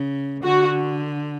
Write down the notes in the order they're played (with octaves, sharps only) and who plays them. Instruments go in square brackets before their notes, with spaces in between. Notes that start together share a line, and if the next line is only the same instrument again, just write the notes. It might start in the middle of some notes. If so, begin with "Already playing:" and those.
Already playing: [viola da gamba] C#3
[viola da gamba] D3 [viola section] F#4